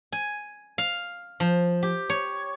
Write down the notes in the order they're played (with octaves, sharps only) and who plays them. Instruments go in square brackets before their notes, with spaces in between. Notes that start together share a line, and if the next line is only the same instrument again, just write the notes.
[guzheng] G#5
F5
F3
G4
C#5